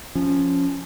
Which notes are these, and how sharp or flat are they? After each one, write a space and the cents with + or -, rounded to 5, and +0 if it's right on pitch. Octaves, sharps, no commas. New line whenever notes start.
F3 +0 C#4 +0